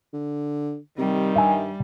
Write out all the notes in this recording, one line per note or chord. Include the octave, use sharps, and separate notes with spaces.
D3
C3 D#3 G3
G2 E5 G#5